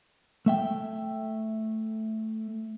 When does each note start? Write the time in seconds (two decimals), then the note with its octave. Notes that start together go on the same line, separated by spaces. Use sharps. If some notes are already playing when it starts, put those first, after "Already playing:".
0.46 A3 E5 G5